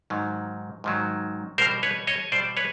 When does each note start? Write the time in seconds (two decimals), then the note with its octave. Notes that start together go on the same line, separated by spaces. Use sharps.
0.10 G#2 D#3 F#3
0.84 G#2 D#3 F#3
1.58 B2 G3 A#4 C5
1.83 B4 C#5
2.07 C#5 D#5
2.32 B2 G3 C5 D5
2.57 B4 C#5